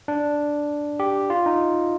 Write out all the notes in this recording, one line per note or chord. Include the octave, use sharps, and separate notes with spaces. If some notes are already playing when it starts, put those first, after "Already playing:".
D4
G4
F4
D#4